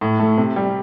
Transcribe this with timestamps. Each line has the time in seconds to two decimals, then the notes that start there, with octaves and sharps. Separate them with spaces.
0.01 A2
0.19 A3
0.38 C3
0.56 G3